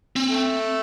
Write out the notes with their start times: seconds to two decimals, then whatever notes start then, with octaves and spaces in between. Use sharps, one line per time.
0.16 C4
0.28 A3